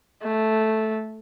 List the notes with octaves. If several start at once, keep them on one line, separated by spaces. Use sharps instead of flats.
A3